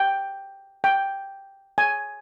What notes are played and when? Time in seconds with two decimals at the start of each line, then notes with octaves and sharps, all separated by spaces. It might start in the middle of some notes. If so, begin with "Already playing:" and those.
Already playing: G5
0.84 G5
1.78 G#5